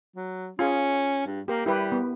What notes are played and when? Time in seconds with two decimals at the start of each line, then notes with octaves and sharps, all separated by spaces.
0.16 F#3
0.59 C#4 F4 G#4
1.26 G2
1.48 A#3 G4 A#4
1.66 G3 E4 G4 B4
1.92 B3